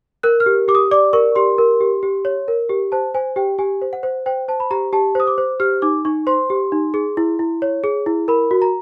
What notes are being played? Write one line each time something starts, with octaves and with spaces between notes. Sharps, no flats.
A#4 F#6
F6
G4
G4 D6
D#6
D5 D6
A#4 C#6
G4 C6
A#4
G4
G4
C#5
A#4
G4
C5 A5
C5 G#5
G4 G5
G4 G#5
C5
F#5
C5
C5 G5
C5 A5
B5
G4 A#5
G4 A5
C5 D#6
D6
C5
G4 F6
D#4 D6
D#4 C#6
C5 C6
G4
D#4
G#4
E4
E4
C#5
G#4
E4
A#4 B5
F#4
A#5